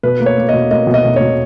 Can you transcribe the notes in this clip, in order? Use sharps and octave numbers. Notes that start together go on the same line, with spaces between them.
B2 B4
A#3
C#5
A#3
B2 D#5
A#3 D#5
B2
D#5
B2
B2 C#5